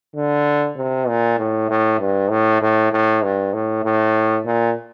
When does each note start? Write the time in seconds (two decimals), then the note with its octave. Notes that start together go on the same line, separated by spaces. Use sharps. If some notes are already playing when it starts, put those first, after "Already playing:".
0.16 D3
0.77 C3
1.08 A#2
1.38 A2
1.70 A2
2.00 G2
2.31 A2
2.62 A2
2.92 A2
3.23 G2
3.54 A2
3.84 A2
4.46 A#2